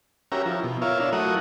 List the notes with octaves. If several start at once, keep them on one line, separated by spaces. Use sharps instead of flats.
C#4 F#4 G4 A#4 E5 A#5
F3 E4
B2
E4 F4 A#4 C#5 E5 F5
D4 F4 C#5 E6
F#3 A3 E4 A#4 F#5 D#6